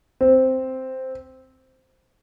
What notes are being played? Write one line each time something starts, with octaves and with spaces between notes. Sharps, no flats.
C4